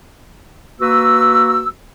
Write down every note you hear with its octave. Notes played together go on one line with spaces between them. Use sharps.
A#3 F#4 B4 E6